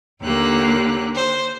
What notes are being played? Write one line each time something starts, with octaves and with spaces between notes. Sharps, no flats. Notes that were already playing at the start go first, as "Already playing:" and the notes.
D#2 D3 A#3 G4 A#5 F#6
C5